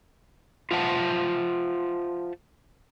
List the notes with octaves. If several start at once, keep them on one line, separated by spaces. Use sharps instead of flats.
F4 C5 E5 F#5 A5